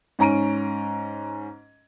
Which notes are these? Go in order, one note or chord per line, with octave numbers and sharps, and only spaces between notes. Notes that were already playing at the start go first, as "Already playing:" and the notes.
G#2 C#4 A#5 D7 D#7